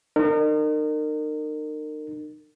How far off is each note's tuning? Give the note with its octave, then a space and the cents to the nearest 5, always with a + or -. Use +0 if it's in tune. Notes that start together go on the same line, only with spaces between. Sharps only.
D#4 -40 A#4 -30